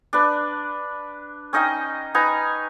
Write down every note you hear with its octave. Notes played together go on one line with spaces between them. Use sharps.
D4 B4
C#4 D#4 D#5 G5
D#4 B4 G#5 A#5